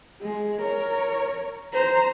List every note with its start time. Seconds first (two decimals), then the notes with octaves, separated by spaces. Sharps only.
0.21 G#3
0.61 A#4 C#5
1.73 C5 A#5